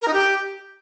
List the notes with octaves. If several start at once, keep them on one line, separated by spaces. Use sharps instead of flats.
A#4
D#4
G4